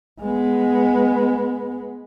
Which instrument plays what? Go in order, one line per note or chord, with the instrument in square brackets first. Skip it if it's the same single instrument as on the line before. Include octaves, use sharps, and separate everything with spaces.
[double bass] G#3 B3